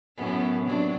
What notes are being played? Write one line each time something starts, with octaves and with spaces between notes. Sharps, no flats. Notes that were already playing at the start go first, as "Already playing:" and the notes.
F#2 A2 B3
C3 F#3 D4